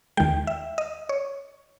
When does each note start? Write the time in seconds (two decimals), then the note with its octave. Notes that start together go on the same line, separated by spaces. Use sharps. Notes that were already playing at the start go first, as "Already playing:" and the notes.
0.17 D#2 D#3 G#3 G5
0.47 E5
0.78 D#5
1.09 C#5